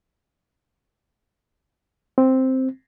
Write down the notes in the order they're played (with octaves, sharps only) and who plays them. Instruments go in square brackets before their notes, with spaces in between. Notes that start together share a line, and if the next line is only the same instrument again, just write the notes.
[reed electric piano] C4